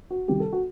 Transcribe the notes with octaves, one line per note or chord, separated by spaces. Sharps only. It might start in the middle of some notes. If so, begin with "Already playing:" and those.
F#4
C2 C3 D#3 G3 G4
A4
F#4